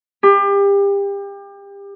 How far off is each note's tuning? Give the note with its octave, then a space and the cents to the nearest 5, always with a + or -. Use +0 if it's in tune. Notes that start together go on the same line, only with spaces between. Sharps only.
G4 +30